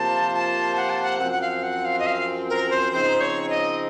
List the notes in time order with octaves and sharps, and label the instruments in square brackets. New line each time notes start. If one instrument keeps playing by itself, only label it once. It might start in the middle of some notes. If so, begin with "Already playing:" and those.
Already playing: [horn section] C3 F3 A#3 F4 C5 [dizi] A5
[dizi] A5
F#5
A5
F#5
[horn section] F#2 F3 C4 [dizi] F#5
[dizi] F#5
F5
F#5
F5
D#5
F5
A#4
C5
[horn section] C#3 F3 C4 D#4 [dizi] C5
[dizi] C#5
D#5